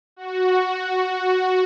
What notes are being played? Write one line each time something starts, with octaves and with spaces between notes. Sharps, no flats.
F#4
F#4